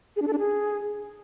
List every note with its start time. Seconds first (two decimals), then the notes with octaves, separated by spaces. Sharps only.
0.16 G#4
0.22 D4
0.27 A4
0.33 D4
0.39 G#4